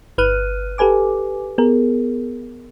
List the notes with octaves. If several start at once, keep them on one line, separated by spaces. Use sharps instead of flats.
G1 B4 F6 F#6 D#7
G4 A4 B4 G#5 D6
B3 G#4 A#4